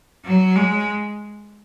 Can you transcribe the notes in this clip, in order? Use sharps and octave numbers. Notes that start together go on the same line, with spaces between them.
F#3
G#3